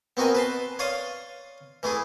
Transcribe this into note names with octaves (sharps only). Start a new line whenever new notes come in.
B3 C4 F#4 A#4 D#5 G#5
B4 A5 C6
C#5 D5 F5 C6 D#6
E3 A3 E4 G#4